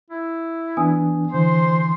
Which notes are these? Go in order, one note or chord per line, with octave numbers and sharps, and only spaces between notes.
E4
E3 B3 D4 G#5 D#6
D3 E3 C5 C6